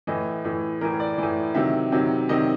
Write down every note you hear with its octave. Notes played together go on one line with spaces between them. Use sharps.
A2 E3 D#5
A2 E3
A2 E3 A#4
D5
A2 E3
C3 D#3 F#3 E5
C3 D#3 F#3
C3 D#3 F#3 D#5